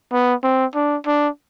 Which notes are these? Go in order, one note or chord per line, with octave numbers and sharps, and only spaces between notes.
B3
C4
D4
D4